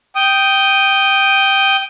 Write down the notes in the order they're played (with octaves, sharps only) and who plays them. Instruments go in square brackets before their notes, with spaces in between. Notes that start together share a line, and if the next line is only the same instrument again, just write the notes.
[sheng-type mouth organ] G5 D#6